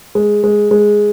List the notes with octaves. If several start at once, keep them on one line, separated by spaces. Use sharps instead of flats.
G#3
G#3
G#3